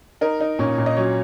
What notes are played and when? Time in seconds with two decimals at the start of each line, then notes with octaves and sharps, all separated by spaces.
0.21 D#4 A#4
0.41 D#4
0.59 A#2 C#4 C#5
0.78 A#2
0.86 D#5
0.97 F#3 C#4 C#5